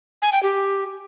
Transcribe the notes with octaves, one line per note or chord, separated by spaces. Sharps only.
G#5
G5
G4